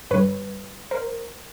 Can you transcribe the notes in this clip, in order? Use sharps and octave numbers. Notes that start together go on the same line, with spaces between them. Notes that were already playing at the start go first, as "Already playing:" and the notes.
G2 D3 G3 B4 C#5
A#4 C5